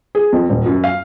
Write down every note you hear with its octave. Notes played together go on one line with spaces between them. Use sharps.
G#4
F2
D#1
F#2
F5